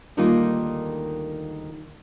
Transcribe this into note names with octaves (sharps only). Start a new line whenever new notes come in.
D2 D#3 G3 A#3 D#4 F4